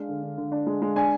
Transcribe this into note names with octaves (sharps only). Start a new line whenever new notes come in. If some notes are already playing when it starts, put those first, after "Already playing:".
Already playing: G#3 D4 F5
D3
D3
D3
D4
G#3
G#3
D4 G#5